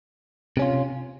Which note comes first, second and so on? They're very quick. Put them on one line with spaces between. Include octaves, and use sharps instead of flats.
C3 C#4 F4